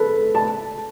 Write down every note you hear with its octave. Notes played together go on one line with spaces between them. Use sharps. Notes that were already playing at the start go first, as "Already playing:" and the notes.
Already playing: A4 B4
A5